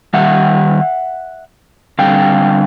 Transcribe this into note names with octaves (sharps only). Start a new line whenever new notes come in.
D#3 G3 E5 F#5
D3 G3 C4 F5 G5